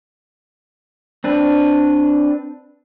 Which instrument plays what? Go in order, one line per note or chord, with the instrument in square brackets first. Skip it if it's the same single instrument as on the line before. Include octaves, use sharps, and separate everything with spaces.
[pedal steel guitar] C4 D4 B4